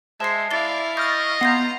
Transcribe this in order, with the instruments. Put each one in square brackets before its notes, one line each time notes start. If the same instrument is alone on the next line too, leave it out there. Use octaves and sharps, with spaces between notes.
[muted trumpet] G#3 [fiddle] C5 [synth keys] E5 [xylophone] A5 C7
[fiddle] E4 F5 [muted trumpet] D5 [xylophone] A6 G7
[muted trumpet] D#5 [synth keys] C#6 F6 A6 [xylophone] G6
[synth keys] B3 F#5 [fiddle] F4 A#5 [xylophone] G6 A#6 C7